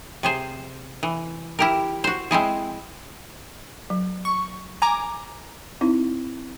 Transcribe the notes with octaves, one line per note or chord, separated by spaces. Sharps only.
C3 G#4 C5
E3
E4 G4 A#4
F#4 C5
G#3 C4 E4 G#4
F#3
C#6
G#5 A#5 D6
C4 D#4 E4